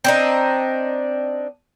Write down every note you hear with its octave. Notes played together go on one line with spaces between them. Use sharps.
C4 D4 D#4